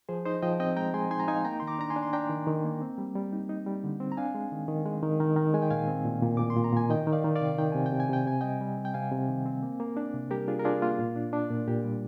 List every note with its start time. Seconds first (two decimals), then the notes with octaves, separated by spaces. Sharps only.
0.09 F3 G#4 C5
0.25 D#4 C5 D#5
0.42 F3 D#5 G5
0.60 C4 D#5 G5
0.76 G#3 G5 A#5
0.94 G#3 G#5 C6
1.11 D#4 G#5 C6
1.20 A#5
1.28 D#4 F5 G#5
1.45 A#3 G5 A#5
1.60 D#3 C6
1.67 A#5 D6
1.79 D4 A#5
1.90 G#5 C6
1.96 D4
2.03 C6
2.13 D4 G5 A#5
2.30 D#3
2.47 D#3
2.64 A#3
2.81 C4
2.98 G3
3.15 G3
3.33 D#4
3.49 D#4
3.66 G3
3.84 D3
4.00 C4
4.12 A#5
4.17 D4 F5 G#5
4.35 G#3
4.52 D#3
4.68 D#3
4.86 G#3
5.03 D#3
5.20 D#3
5.36 D#3
5.54 G#3 G#5
5.62 G5
5.70 A#2 F5 G#5
5.88 C4
6.05 A#2
6.22 A#2
6.37 A#2 D6
6.50 C6
6.56 A#2
6.64 A#5
6.73 A#2 G#5
6.90 D#3 D#5 G5
7.07 D#3
7.13 D5 F5
7.24 D#3
7.35 D5 F5
7.41 C3
7.58 D#3 G5
7.72 C3 G#5
7.86 G5
7.92 C3
8.00 G#5
8.09 C3 G5
8.26 C3 G#5
8.41 G3 D#5 G5
8.61 G3
8.78 C4
8.85 G5
8.94 C3 F5 G#5
9.12 C3
9.29 D#3
9.46 C4
9.63 A#3
9.80 A#3
9.97 D4
10.14 C3
10.31 G3 G4 A#4
10.48 D4 F4 G#4
10.59 A#4
10.65 D4 F4 G#4
10.82 A#3 F4
10.99 A#2
11.16 D4
11.33 D4
11.50 A#2
11.68 A#2 G4
11.84 G3